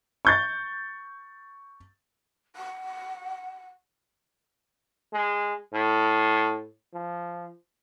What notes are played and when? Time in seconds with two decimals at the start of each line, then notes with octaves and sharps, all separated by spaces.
0.25 C#6 G6 A6
2.56 F#5
5.13 G#3
5.73 A2
6.94 F3